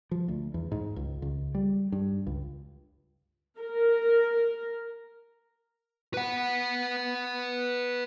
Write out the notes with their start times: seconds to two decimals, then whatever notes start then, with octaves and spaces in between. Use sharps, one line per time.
0.11 F3
0.28 D2
0.54 E2
0.72 G#2
0.96 C#2
1.22 C#2
1.55 G3
1.92 G2
2.27 C#2
3.60 A#4
6.14 B4 F#5